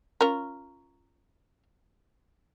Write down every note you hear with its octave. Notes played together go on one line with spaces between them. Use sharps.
C#4 F4 A#4